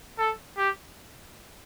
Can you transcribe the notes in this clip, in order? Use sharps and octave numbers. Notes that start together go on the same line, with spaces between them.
A4
G4